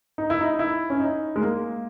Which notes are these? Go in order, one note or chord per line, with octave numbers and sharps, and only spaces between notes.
D#4
E4
D#4
E4
C#4
D#4
G#3
A#3